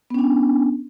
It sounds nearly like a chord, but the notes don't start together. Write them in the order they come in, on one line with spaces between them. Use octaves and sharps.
B3 C#4 D4